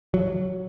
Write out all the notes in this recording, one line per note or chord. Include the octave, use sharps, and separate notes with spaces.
F#3